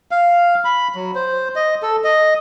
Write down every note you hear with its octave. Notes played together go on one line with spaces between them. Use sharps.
F5
B5
F#3
C5
D#5
A4
D#5